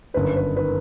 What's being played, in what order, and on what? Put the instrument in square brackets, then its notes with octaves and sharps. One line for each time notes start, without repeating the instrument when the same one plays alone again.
[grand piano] G1 F#2 D#3 B4
B4
D#3 B4